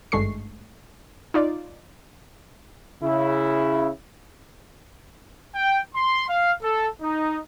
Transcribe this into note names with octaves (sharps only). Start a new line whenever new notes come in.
G#1 G2 G#3 A3 C#6 C7
D#4 F4 D5
C#3 E4
G5
C6
F5
A4
D#4